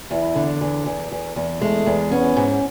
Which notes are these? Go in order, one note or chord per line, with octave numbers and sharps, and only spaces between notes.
E2 E4
D3
E2
E2
E2
E2
G#3 A3
E2
B3 C#4
G#2